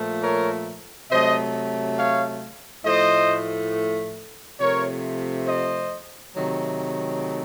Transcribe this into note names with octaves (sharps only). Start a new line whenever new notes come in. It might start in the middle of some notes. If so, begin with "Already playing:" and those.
Already playing: A#2 F3 A3
A#4 C#5
C3 F#3 A3 C5 D#5
C#5 F5
A2 F3 A3 C5 D#5
C3 F3 A3 A#4 C#5
C5 D#5
C3 D#3 F#3 A3